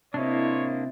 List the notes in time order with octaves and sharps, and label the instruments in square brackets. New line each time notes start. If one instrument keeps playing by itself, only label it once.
[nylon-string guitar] C3 [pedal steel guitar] A#3 D4 [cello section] E4 C5 D#5 [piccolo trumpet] C#5